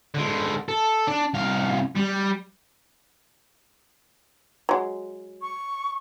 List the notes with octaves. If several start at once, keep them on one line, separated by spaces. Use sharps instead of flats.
D3 G#3
A4
D4
C2 F5
G3
F#3 G#3
C#6